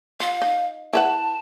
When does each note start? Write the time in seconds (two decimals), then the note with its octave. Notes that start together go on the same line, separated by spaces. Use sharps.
0.20 F4 F5
0.42 D#4
0.93 E4 B4 F#5 A5